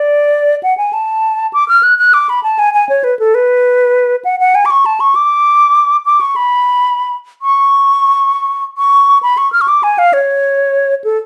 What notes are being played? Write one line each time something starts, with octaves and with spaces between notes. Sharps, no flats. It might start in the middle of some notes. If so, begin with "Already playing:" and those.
Already playing: D5
F#5
G#5
A5
D6
F6
F#6
F#6
D6
B5
A5
G#5
G#5
C#5
B4
A4
B4
F#5
F#5
G#5
D6
C#6
A5
C#6
D6
D6
C#6
B5
C#6
C#6
B5
C#6
F6
C#6
D6
G#5
F5
C#5
A4